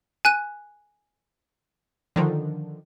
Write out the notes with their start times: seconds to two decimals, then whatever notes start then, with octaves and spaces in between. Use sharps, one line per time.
0.25 G#5 F#6 D#7
2.16 D3 D#3 F3